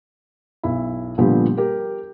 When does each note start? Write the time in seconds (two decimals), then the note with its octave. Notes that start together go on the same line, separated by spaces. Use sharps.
0.63 B1 E4
1.18 A#2 D3 F3 G3 B3 G4
1.57 G4 A#4